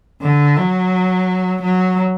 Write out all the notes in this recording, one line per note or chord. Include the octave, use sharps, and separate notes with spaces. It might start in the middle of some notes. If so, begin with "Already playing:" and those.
D3
F#3
F#3